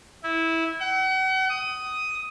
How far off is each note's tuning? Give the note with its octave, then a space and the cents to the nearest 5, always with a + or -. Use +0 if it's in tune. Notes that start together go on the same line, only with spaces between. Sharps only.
E4 -15
F#5 +40
D#6 +10